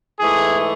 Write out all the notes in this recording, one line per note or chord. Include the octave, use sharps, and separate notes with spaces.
G#2 E3 A3 G#4